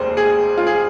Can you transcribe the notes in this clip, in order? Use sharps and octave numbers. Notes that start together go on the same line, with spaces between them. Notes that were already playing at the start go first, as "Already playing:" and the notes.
Already playing: F1 D#2 G#4 C5
G#4
F4
G#4